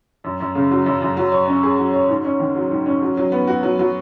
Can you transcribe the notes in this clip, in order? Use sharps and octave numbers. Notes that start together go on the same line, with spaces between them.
F#2
F#2
C#3
F#3
F#2
F#2
F#3
C#5
C#4
G#4
F#3
C#5
G#2
C#4
D#3
F#3
G#2
C#4
F#3
F#3
B3
F#4
F#3
F#3